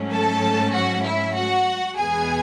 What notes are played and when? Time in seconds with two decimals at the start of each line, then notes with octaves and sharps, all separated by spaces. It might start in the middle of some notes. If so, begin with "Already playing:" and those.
Already playing: G#2 F#3 A3 C#4
0.12 A4 A5
0.73 F#4 F#5
1.04 E4 E5
1.35 F#4 F#5
1.97 E2 B2 G#3 B3 G#4 G#5